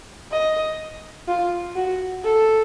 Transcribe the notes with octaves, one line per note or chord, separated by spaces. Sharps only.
D#5
F4
F#4
A4